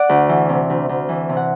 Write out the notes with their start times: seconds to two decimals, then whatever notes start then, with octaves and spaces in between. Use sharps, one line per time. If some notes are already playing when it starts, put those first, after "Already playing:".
Already playing: D5 F#5
0.09 D2
0.29 E3
0.49 C3
0.70 D2
0.89 D2
1.09 E3
1.29 C3
1.37 F#5